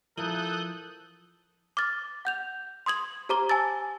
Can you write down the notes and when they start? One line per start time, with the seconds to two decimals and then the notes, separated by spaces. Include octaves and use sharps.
0.17 F3 E4 A4 A#4 D#6 F#6 G6
1.77 D6 F6 A6
2.25 F#5 G6 F7
2.86 C6 D#6 G#6 F#7
3.29 G4 C5 A#5 D6 G7
3.49 G#5 A5 E6 A6